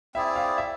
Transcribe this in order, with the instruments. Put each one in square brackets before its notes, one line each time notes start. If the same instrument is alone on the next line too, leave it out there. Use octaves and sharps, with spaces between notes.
[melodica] C4 E4 G#4 D5 [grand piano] E5
[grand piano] F5
E5